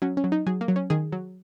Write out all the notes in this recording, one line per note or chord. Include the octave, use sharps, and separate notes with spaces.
F#3 C#4
C#4
F#3
D#4
F#3 G#4
A#3
F#3
C#4
D#3 G#4
F#3